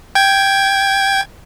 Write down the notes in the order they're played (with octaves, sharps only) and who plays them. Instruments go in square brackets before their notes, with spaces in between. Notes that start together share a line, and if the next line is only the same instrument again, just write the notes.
[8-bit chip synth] G5 G#6